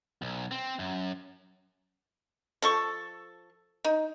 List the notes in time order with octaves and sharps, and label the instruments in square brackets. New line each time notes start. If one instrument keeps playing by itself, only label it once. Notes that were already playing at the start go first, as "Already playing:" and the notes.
[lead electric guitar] B1
C4
F#2
[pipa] F3 A4 C#6
D#4